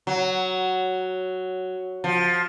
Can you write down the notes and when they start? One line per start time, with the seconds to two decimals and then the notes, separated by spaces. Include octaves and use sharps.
0.07 F#3
2.04 F3